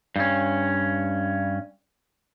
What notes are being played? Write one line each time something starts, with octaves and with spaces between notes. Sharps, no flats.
G2 C#4